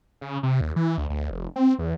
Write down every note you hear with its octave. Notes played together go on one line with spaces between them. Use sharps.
C#3
C3
D#2
E3
D2
D2
F1
C4
E2